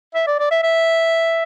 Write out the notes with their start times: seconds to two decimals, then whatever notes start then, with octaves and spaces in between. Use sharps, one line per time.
0.15 E5
0.27 D5
0.39 D5
0.51 E5
0.63 E5